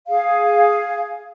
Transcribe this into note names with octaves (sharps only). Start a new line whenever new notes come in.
G#4 F5